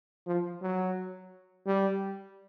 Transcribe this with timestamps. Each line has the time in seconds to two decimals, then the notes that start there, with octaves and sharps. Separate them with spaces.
0.27 F3
0.62 F#3
1.67 G3